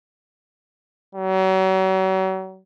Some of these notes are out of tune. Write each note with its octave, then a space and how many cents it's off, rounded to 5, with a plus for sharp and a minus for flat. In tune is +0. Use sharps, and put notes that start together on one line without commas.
F#3 +40